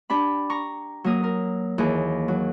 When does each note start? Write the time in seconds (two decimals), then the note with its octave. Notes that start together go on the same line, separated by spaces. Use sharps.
0.10 D4 G4 B5
0.50 A#5 C#6
1.04 F#3 A#3 A#4 D#6
1.24 A#4
1.78 D#2 E3 G#4
2.28 F#3